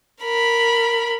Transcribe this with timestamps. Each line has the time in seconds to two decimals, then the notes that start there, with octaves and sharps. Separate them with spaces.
0.22 A#4 B5